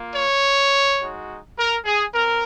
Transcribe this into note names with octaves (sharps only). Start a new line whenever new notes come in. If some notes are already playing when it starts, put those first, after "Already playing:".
Already playing: A#3 F4
C#5
G#3 D#4 F#4
A#4
G#4
C4 A#4